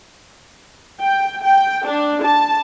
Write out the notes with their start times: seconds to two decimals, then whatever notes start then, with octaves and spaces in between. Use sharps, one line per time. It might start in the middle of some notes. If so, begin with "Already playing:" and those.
1.00 G5
1.43 G5
1.87 D4
2.25 A5